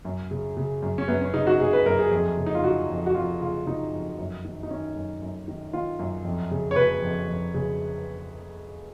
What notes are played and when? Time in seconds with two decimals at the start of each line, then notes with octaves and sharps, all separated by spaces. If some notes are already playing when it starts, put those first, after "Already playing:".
0.05 F#2
0.31 C#3
0.57 C#3
0.82 F#2
0.98 C#4
1.08 F#2 B3
1.21 C#4
1.34 C#3 D#4
1.47 F#4
1.60 C#3 G#4
1.73 B4
1.86 F#2 A#4
1.99 G#4
2.11 F2 G#4
2.37 C#3
2.46 D#4
2.55 F4
2.63 C#3 F#4
2.90 F2
3.06 F#4
3.15 F2 F4
3.41 C#3 F4
3.66 C#3 D#4
3.93 F2
4.18 F#2
4.44 D#3
4.63 D#4
4.70 D#3 C#4
4.96 F#2
5.22 F#2
5.48 D#3
5.73 D#3 F4
5.99 F#2
6.25 F2
6.51 C#3
6.71 C#5
6.76 C#3 B4
7.02 F2
7.29 F2
7.54 C#3